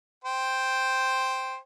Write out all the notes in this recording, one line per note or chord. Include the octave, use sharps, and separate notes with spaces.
C5 G5